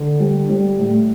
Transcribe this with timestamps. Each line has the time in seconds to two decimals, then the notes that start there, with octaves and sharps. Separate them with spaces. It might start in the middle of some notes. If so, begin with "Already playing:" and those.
Already playing: D3
0.20 G3
0.50 G3
0.79 A2